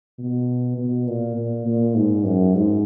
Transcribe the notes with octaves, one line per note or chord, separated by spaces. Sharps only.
B2
B2
A#2
A#2
A#2
G#2
F#2
G#2